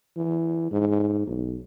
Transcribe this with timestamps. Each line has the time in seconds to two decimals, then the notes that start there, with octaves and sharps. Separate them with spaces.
0.17 E3
0.71 G#2
1.27 B1